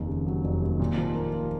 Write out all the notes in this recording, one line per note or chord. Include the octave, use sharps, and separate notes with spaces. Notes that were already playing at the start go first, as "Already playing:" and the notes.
Already playing: F1 D#2
C#3
F#3
F1
D#2
A#2
F3
A#3
F4